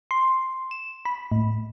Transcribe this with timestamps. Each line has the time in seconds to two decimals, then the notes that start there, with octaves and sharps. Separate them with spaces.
0.11 C6
0.71 E7
1.05 B5
1.32 A2